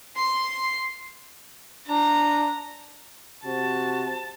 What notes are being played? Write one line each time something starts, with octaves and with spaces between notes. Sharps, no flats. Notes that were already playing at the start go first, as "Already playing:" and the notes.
C6
D4 A#5
C3 F#4 A5